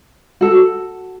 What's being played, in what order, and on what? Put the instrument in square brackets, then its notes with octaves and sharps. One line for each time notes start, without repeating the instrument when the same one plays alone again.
[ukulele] F#4 A4